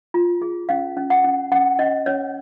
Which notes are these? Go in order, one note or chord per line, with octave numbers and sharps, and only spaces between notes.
F4
G#4
C#4 F5
C#4
F#5
C#4
C#4 F#5
C#4 D#5
C#4 C#5